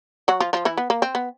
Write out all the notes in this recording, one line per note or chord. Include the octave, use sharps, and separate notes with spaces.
F#3 F#4
F3 F4
F3 F4
E3 E4
B3
A#3
C4
B3